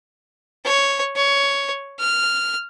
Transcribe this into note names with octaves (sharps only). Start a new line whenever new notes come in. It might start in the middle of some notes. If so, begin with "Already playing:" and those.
C#5
C#5
F6